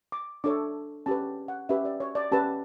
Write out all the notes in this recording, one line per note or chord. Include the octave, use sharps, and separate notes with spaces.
D6
D4 A4 C#5 D6
C#4 G4 B4 A5
F#5
C#4 G4 B4 E5
D5
C#5
D5
C#4 G4 B4 A5